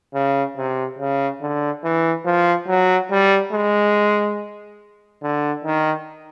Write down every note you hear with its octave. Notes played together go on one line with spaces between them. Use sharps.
C#3
C3
C#3
D3
E3
F3
F#3
G3
G#3
D3
D#3